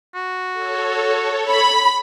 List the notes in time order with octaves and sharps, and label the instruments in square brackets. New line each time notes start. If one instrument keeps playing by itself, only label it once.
[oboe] F#4
[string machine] A4 C#5
[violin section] B5